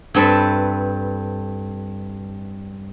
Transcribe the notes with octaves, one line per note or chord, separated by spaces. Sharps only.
G2 C4 A4 B4 E5